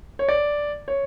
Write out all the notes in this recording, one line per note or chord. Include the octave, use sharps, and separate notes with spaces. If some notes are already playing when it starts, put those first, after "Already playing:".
C#5
D5
C#5